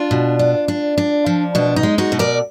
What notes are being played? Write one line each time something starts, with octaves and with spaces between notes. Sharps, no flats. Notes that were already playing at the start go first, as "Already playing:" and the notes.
Already playing: D4 F4
B2
D4
D4
D4
F3
B2 D4
D#4
G#3
D#4 F#4
B2
A#4 D5